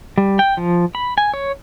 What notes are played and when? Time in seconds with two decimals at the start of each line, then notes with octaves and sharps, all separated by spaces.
0.18 G3
0.39 G5
0.57 F3
0.95 B5
1.18 G#5
1.34 C#5